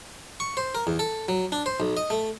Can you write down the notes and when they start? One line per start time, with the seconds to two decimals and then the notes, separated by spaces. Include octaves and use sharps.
0.40 C#6
0.57 C5
0.75 A#4
0.87 E2
0.99 A4
1.28 F#3
1.52 D4
1.66 C5
1.80 B1
1.97 D#5
2.10 A3